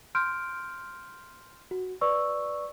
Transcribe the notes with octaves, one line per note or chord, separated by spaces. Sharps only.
C6 F6 G6 D7
F#4
B4 D5 C#6 E6